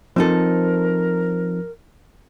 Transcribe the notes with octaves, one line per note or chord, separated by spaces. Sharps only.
F3 C4 D#4 A4 A#4